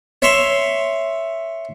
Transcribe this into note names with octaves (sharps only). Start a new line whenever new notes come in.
C#5 E5 C6